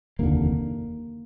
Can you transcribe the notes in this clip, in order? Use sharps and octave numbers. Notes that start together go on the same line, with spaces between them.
F1 D#2 D3 A#3